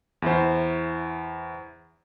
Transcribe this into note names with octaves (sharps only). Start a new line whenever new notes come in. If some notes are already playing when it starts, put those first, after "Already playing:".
E2 E4 C5